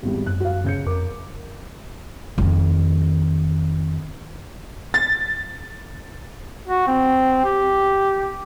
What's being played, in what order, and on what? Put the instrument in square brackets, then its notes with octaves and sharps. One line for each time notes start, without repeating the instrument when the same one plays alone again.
[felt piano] G#1 E2 G3
[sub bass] F#2 [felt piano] F#6
[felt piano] F#4 F5
C#3 G6 C#7
[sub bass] F2 [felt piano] A#4 D6
[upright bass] F2 D#3
[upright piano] A6
[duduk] F#4
C4
G4